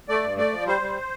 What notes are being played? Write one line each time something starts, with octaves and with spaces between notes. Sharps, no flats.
A3 D5
G2
A3 D5
F3
G3 C5
G3